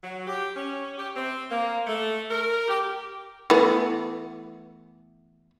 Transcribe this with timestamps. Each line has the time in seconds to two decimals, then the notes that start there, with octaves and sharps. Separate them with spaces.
0.04 F#3
0.27 G4
0.56 C#4
0.97 G4
1.16 C4
1.49 A#3
1.87 A3
2.29 A#4
2.68 G4
3.50 E3 A3 B3